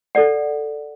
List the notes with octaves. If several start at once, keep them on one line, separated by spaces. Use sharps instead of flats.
A4 D5 F#5